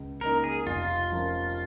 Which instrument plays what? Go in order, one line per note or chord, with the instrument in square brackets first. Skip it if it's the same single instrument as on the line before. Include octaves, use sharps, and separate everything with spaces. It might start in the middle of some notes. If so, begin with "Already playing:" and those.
Already playing: [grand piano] C#2
[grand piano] C#3 A#3 D#4 [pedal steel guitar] A#4
[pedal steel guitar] G#4
[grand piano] F1 [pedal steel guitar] F4
[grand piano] F3 C#4 A#4